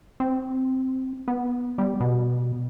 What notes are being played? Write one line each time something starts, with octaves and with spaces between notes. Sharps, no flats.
C4
B3
G3
B2